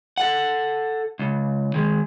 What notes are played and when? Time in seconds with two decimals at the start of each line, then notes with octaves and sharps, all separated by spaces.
0.18 A4 F#5
1.19 C#2
1.74 D#3 G#3